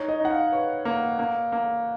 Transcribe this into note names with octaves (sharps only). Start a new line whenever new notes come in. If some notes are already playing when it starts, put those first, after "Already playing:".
Already playing: D#4 C#5
D#5
D#4 F#5
F5
B4 C#5
A#3
A#3
A#3